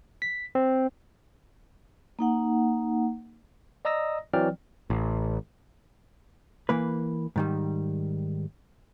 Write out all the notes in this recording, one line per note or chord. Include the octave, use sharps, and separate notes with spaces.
B6
C4
A#3 D#4 F#5
D5 D#5 A#5 D#6 E6 A#6
E3 F#3 C4 D5 G5 F6
A1
E3 A#3 B4
G#2 D#3 G3